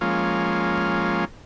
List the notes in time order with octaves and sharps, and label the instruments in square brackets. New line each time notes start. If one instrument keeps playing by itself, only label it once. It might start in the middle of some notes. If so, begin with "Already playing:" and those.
[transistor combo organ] F3 G#3 A#3 C#4 F4